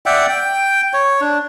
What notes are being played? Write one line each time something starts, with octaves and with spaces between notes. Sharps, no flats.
D5 E5 F#5 G5
G5
C#5
D4